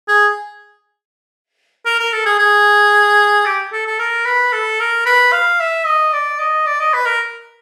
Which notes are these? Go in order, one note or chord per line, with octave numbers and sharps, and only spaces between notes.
G#4
A#4
A#4
A4
G#4
G#4
G4
A4
A4
A#4
B4
A4
A#4
B4
F5
E5
D#5
D5
D#5
D5
D#5
B4
A#4